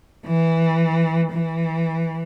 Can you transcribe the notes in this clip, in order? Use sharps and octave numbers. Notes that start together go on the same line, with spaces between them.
E3
E3